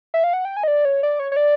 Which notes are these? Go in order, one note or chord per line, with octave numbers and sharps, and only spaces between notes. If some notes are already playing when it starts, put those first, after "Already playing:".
E5
F5
F#5
G5
G#5
D#5
D5
C#5
D5
C#5
C#5
D5